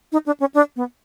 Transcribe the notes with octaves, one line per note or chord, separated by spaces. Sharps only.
D#4
D4
C#4
D4
B3